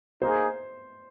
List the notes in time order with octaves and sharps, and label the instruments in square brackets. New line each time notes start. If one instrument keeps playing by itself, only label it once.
[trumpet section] A#3 D#4 G#4 [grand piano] C5